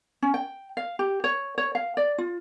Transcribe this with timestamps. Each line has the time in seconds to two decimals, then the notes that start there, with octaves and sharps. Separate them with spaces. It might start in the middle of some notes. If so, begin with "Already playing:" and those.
0.22 C#4
0.34 G5
0.77 F5
0.99 G4
1.24 C#5
1.58 C#5
1.75 F5
1.97 D5
2.18 F4